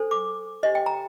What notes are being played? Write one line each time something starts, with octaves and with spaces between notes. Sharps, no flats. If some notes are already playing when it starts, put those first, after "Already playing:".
Already playing: D4 A4 C5
D6
D4 G4 C5 D#5
G5
A#5